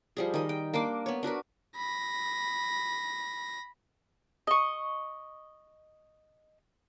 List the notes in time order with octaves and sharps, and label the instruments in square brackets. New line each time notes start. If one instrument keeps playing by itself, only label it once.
[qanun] F3 G3 G#4
D#3 D#5
G5
A#3 D4 C6 D6
B3 C#5
D4 F#4 A#4 B4
[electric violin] B5 A#6
[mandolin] D#5 C#6